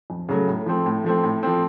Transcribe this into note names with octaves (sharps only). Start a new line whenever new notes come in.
F2
C#3 F#3 A3
A2
F3 A3 C4
A2
F3 A3 C4
A2
F3 A3 C4